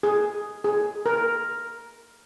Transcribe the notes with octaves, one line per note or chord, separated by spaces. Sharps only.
G#4
G#4
A#4